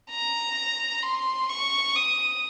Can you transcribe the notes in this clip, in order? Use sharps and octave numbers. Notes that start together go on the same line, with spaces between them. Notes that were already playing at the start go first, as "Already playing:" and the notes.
A#5
C6
C#6
D#6